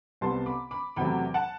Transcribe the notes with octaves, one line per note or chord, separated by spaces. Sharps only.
C2 C3 G3 B3 A5 C6
B5 D6
B5 D6
E2 C3 F#3 A3 G5 B5
F#5 A5